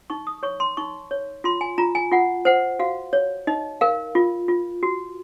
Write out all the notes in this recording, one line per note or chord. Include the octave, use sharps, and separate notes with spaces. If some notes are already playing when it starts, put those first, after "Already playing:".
D#4 C#6
D#6
C#5 C#6
C6
D#4 C#6
C#5
F4 C6
G#5
F4 A#5
G#5
F4 F#5
C5 F#5
F#4 F5
C#5
D#4 D#5
A#4 F5
F4
F4
F#4